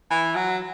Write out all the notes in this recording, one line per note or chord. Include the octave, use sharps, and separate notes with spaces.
E3
F#3